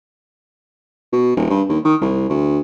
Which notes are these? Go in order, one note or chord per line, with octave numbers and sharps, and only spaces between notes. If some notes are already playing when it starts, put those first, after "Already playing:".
B2
D#1
G2
D#2
D#3
C2
D2